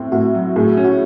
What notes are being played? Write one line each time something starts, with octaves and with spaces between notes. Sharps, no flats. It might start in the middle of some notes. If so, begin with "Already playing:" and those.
Already playing: A2 C4
A2 F#4
F#3
A2 G#4
C#4
F#4